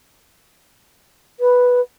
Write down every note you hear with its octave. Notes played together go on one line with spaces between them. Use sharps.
B4